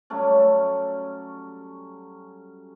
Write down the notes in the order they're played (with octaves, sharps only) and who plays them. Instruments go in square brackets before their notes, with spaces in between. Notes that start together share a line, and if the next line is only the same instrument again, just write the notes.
[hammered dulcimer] F#3 G3 A3 C#4